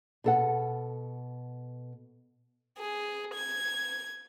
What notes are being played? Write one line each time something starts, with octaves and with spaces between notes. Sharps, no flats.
B2 A4 F#5
G#4
G#6